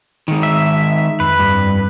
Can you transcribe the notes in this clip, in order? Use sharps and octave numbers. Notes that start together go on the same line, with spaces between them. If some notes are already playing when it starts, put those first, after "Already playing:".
D#3 G#3
E5
F2 B4
G2